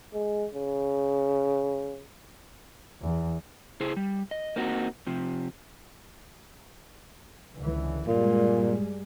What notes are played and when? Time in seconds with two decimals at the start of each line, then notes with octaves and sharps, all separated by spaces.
0.14 G#3
0.54 C#3
3.01 E2
3.80 C#3 E4 G#4 C5
3.96 G3
4.31 D#5
4.56 A#3 C4 D#4 F#4
5.07 C3 F3
7.57 C#2 D3 E3
8.07 G2 A#2 G3 G#3